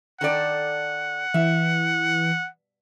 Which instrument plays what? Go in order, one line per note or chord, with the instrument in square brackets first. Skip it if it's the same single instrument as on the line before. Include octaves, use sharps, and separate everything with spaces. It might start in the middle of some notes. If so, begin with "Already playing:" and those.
[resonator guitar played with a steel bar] D#3 A4 D5 [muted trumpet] F#5
[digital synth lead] E3 [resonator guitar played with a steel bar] E5